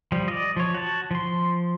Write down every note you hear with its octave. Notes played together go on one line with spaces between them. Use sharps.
F3 G3
D5 D#5
F3 C#5
F#4 A5
F3 C6